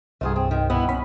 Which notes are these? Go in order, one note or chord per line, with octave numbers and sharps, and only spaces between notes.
C2 G2 A3 F4 G#4
C4 G#4
D#3
B2 B3 E4
C#4 B5